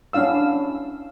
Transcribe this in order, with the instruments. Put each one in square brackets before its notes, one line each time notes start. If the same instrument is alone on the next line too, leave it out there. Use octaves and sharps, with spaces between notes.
[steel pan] C#4 D4 E4 F5 E6